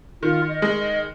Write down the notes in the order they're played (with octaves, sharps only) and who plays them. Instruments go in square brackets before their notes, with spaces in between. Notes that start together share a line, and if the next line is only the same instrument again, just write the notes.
[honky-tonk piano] D#3 [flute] F4
[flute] D#5
[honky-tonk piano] G#3
[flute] D#5